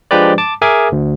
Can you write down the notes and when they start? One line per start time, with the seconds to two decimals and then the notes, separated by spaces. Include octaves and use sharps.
0.11 F3 G#3 D4 G4 B4 D5
0.38 A5 D6
0.62 G#4 A#4 E5 G#5 D6
0.92 D2